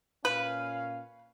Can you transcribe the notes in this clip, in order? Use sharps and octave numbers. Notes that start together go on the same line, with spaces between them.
A#2 C#4 B4 F5